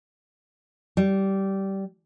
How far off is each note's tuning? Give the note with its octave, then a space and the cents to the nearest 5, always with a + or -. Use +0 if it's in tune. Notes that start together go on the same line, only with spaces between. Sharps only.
G3 -15